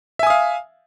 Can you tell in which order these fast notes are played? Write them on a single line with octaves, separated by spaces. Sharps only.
E5 G#5 D#6 F5